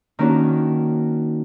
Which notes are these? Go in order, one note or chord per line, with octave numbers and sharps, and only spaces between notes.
D#3 A#3 C#4 D4 F#4